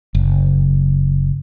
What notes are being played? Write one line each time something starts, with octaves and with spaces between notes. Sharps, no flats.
F#1